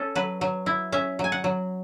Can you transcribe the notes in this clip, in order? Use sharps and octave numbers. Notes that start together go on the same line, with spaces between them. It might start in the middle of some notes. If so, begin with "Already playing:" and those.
Already playing: C#4 A4
F#3 B4
F#3
E4
C#4 E5
F#3 G#5
F#5
F#3